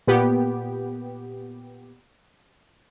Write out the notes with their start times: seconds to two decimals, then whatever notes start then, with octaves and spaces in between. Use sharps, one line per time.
0.07 A#2 B3 G4